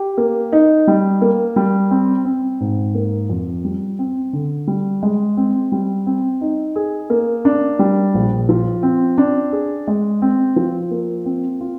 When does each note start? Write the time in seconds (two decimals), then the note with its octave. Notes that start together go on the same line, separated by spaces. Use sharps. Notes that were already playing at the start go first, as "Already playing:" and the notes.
Already playing: G4
0.17 A#3
0.52 D#4
0.87 G3
1.21 A#3
1.56 G3
1.91 C4
2.25 C4
2.60 G#2
2.95 A#3
3.30 F2
3.64 G3
3.99 C4
4.33 D3
4.67 G3
5.03 G#3
5.37 C4
5.72 G3
6.06 C4
6.41 D#4
6.76 G#4
7.10 A#3
7.45 D4
7.79 G3
8.14 A#1
8.49 F3
8.83 C4
9.18 D4
9.52 G#4
9.87 G#3
10.22 C4
10.56 F3
10.91 A#3
11.25 C4
11.61 F4